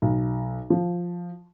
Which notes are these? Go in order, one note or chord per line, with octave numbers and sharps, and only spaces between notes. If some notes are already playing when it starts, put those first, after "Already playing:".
B1
F3